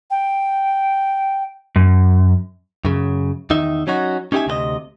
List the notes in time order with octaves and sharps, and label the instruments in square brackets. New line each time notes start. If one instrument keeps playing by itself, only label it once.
[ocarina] G5
[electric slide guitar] F#2
[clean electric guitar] F#2 C#3
E2 D#3 D#4 E5
F#3 C#4 D#4 F#4
C#4 D#4 G4 B4 E5 G#5
D2 C3 A4 D#5